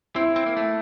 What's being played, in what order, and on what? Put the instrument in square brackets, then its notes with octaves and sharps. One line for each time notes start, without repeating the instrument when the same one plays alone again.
[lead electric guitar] C4 [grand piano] E4
[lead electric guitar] C4
A#3
A3